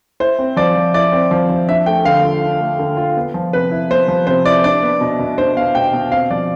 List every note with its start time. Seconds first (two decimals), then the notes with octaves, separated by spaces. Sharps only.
0.20 E4 C5
0.39 C4
0.56 F3 D5
0.76 F3
0.94 E4 D5
1.12 C4
1.31 F3
1.49 F3
1.68 D4 E5
1.86 A3 G5
2.05 D3 F5
2.24 F4
2.42 D4
2.61 A3
2.79 D3
2.97 F4
3.17 B3
3.34 F3
3.53 C3 B4
3.71 E4
3.90 B3 C5
4.08 F3
4.27 C3 C5
4.46 E4 D5
4.64 D4 D5
4.83 B3
5.01 B2
5.19 B2
5.38 D4 C5
5.57 B3 F5
5.75 B2 G5
5.93 B2
6.12 C4 F5
6.30 F3 D5